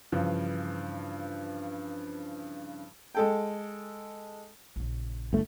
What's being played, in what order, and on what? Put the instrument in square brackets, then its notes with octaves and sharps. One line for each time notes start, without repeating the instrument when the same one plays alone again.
[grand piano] G2 C#3 E3 F3
[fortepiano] G#3 A4 G5
[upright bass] A#1 C#3
[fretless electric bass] G1 A3